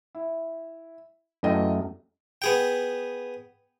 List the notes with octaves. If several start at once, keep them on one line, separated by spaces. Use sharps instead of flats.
E4
F#2 E3 A3 D#5 G5
B3 G#4 G5